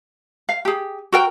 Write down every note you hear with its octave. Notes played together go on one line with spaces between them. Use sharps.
F5
G4 G#4
F#4 A#4 G5